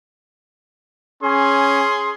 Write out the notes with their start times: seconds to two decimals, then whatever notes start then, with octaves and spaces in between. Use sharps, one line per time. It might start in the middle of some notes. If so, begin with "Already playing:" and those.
1.23 C#4 G#4 C6